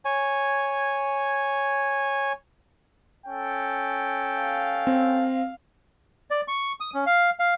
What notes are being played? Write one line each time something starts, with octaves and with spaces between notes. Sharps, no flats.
C#5 G#5
C#4 A4 G5
F5
C4
D5
C#6
D#6
C#4
F5
F5